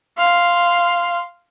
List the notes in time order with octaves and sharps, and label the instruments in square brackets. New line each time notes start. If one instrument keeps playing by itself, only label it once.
[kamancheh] F5 C6